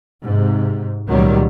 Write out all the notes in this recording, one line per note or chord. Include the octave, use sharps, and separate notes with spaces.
G#2 C3
C#2 A#2 D#3 F#3 G3